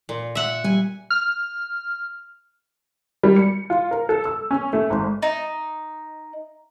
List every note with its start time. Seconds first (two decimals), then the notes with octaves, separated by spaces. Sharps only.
0.09 A#2
0.35 E5 F#5
0.64 G3 G#5
1.10 F6
3.23 G3
3.36 C#7
3.70 F4
3.91 A#4
4.09 A4
4.25 E6
4.51 C#4
4.73 A3
4.90 G#1
5.22 D#4